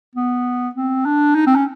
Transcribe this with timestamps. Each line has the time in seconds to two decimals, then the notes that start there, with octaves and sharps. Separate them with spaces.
0.15 B3
0.75 C4
1.05 D4
1.35 D#4
1.47 C4
1.56 C#4